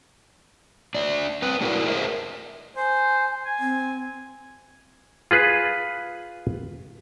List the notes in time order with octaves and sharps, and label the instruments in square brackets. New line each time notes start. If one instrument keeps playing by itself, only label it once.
[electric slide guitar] D4 D5 E5
C4 B4
A3 D4 E4 F#4 A#4 D5
G#4 A#4 C5 D#5 E5
[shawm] C5 [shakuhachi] G#5
[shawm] G#5
[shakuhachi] C4
[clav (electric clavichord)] F4 G#4 B4